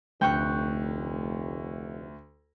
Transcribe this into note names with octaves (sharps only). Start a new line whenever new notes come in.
F1 D2 G5 C#6 F#6